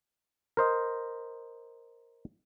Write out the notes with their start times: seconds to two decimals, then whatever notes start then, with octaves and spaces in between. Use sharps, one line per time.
0.57 A#4 C5 D#5